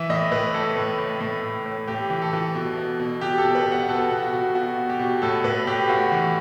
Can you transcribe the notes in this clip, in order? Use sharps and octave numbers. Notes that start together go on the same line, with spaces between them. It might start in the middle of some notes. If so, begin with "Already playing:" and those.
Already playing: E3 E5
A2 D#5
A2 B4
A2 A4
A2
A2
A2
A2
A2
A2 G4
E3
A4
E3
B2
B2
B2
B2 G4
A4
B2
B4
B2
F#5
B2 A4
B2
F#4
B2
B2 F#4
B2
G4
B2
A2 A4
A2 B4
A2 G4
A2 F#4
E3